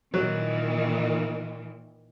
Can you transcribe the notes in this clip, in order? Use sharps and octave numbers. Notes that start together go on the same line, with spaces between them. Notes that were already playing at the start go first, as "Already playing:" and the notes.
A#2 D#3 E3 F#3